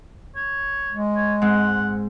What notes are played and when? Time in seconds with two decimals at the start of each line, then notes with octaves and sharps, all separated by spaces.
0.36 C#5
0.91 G#3
1.16 C#5
1.42 G#2 C4 F#5